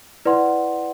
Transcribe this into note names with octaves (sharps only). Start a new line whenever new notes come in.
E4 B4 D5 F#5 C6